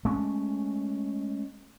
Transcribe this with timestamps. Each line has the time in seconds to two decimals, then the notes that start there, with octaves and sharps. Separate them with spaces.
0.05 G#3 A3 C#4